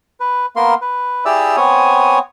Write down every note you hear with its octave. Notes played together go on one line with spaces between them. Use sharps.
B4
A#3 B3 A#4 C6
B4
E4 G4 G#4 D5 E5 E6
B3 C4 C#5 G#5 D#6